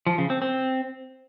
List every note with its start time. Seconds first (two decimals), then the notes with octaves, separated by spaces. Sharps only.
0.07 F3
0.18 C#3
0.30 C4
0.42 C4